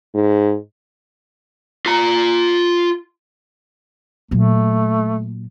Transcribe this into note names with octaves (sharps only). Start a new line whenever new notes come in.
G#2
F4 A#5
A#2 F#3 A3